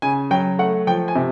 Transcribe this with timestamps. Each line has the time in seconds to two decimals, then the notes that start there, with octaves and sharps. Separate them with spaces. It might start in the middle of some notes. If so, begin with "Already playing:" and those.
0.02 C#3 G#5
0.31 F#3 G5
0.59 A3 F#5
0.87 F3 G5
1.08 G#5
1.15 C3